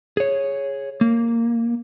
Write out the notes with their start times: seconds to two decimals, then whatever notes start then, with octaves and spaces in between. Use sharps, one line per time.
0.17 G#4 C#5
1.01 A#3